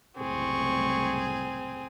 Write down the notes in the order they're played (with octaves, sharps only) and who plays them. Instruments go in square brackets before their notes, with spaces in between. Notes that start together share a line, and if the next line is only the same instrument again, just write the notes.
[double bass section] F#1 C2 A2 [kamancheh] C4 G#4 [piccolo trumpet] C#6